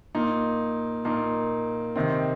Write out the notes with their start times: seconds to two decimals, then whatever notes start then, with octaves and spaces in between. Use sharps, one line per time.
0.15 A#2 A#3 D#4
1.05 A#2 A#3 D#4
1.96 C3 D#3 C4